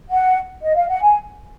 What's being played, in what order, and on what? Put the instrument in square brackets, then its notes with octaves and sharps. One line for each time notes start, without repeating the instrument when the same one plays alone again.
[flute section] F#5
D#5
F5
F#5
G#5